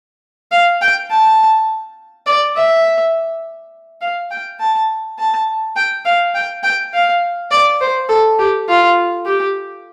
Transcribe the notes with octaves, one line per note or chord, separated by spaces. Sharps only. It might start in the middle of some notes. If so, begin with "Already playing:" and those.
F5
G5
A5
D5
E5
F5
G5
A5
A5
G5
F5
G5
G5
F5
D5
C5
A4
G4
F4
G4